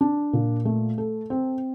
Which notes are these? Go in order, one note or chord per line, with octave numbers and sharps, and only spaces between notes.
D4
A#2
A3
A4
C4